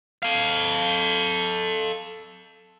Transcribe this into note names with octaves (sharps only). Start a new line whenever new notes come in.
A4 F5